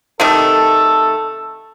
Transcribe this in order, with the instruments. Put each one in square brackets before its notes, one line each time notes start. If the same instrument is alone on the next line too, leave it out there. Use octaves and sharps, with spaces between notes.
[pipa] C3 D#3 A3 [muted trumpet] A4